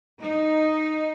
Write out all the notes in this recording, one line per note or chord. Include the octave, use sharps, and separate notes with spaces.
D#4